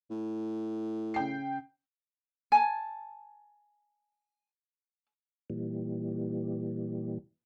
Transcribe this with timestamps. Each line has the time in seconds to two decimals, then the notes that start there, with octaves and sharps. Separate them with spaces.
0.10 A2
1.14 C#3 G5 C7
2.52 G#5 A5
5.50 A#2 E3 G3